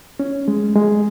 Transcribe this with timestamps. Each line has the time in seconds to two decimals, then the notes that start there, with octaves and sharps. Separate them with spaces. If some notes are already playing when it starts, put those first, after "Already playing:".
0.20 C#4
0.48 G#3
0.76 G#3